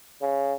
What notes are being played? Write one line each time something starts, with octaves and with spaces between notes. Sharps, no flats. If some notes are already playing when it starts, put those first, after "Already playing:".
C#3